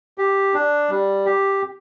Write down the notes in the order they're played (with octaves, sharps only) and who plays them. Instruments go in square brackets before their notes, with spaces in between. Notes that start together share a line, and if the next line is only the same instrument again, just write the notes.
[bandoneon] G4
D4
G3
G4